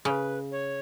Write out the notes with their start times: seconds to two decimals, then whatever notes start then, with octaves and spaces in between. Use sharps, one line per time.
0.05 C#3 C#5
0.10 B4
0.52 C#5